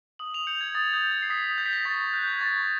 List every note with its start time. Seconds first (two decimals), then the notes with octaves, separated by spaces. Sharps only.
0.19 D#6 F#7
0.34 F7
0.47 G6 C#7
0.61 G#6
0.75 D#6 A6
0.93 G6
1.03 G6
1.11 G#6
1.22 C7
1.30 D#6 B6
1.58 G6 A#6
1.66 B6
1.73 A#6
1.85 C#6 A6
1.99 A#6
2.13 F#6 G6
2.27 G#6
2.41 C#6 A6